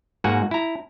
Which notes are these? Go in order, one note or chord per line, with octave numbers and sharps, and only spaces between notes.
G#2 A#3 F#4 F#5 G#5
E4 A#5